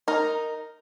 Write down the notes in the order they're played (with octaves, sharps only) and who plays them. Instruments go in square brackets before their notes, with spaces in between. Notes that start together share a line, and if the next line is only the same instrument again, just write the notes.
[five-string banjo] D#4 A#4